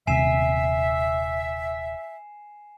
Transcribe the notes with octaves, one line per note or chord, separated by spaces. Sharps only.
D#1 C3 E5 G#5 C7 E7